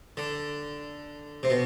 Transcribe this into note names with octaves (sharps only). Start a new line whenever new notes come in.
D3
C3
B2